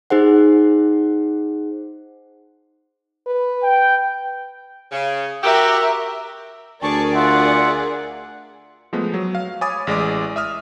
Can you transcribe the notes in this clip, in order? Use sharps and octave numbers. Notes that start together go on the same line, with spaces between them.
D#4 G#4 C5 F#5
B4
G5
C#3
F#4 G4 A#4 E5
D2 G#4 A#4 D5 A5 C#6
F4 E5 F#5
F3 G#3 A3 B3
F#3
F5
C#5 G#5 B5 D6 D#6 A6
A1 G#3 D5 D6
E5 D#6 F6